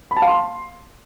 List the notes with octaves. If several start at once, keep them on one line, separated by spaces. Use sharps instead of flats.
B5
A5
F5
C6